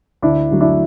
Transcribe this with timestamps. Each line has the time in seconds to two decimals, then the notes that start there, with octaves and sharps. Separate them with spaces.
0.22 D2 D4 E4
0.51 D3 F#3 A3
0.61 D4 E4